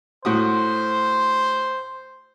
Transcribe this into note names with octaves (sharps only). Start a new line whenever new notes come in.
A2 F#4 C5 D#6